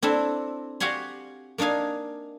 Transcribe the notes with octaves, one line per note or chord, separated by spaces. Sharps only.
C4 D4 E4 A4
F#4 G4 F5 F#5 G#5 C6
A#3 D4 D#4 F5 G#5